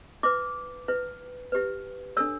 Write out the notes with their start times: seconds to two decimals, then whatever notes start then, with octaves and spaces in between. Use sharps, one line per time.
0.23 E4 B4 D6
0.88 E4 B4
1.52 E4 G4 B4
2.17 D4 A4 C#5 E6